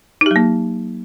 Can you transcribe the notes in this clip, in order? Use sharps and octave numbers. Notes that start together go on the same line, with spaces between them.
F#3 A#3 D#4 G4